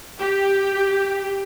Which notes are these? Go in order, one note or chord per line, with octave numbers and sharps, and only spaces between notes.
G4